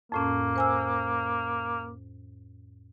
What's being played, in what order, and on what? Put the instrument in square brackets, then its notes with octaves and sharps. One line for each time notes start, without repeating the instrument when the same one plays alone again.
[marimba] F2 A2 C#4 [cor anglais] A#3
[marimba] C5 G#5 E6